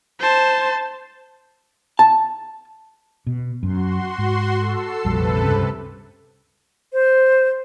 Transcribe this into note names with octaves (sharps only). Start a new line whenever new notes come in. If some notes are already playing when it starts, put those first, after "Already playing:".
C5 A5
A5
B2
F#2 F#4 C6
G#2
A4 E6 C7
A#1 F2 C3 G3 A4 B4
C#2 G2 C#3
C5